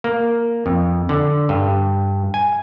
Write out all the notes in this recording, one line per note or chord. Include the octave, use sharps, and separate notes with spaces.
A#3
F2
D3
G2
G#5